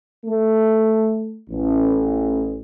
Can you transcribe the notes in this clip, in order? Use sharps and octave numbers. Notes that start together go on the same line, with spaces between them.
A3
A1